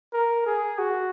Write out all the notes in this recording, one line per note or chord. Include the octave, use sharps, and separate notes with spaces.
A#4
G#4
F#4